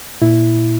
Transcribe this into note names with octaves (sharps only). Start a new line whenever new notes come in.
A#2 E4